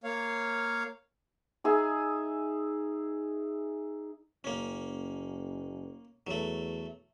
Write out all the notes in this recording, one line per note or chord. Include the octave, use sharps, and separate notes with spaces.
A#3 C#5 F5
D#4 G#4 E5
F#1 A#3 C#4
E2 F#3 A3